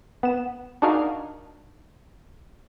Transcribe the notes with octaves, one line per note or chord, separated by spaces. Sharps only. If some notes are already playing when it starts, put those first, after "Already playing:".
B3 E7
D4 D#4 F#4 G#4 A#4 F5